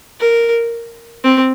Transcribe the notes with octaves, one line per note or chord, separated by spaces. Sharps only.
A#4
C4